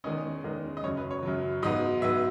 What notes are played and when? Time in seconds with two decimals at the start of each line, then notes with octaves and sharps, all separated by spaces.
0.04 E2 D#3 G#3 C#4 D#5
0.44 E2 D#3 G#3 C#4
0.77 D#5
0.83 F#2 C#3 F#3 C#5
0.97 B4
1.11 C#5
1.23 F#2 C#3 F#3
1.63 G#2 F#3 B3 D#5
2.02 G#2 F#3 B3 E5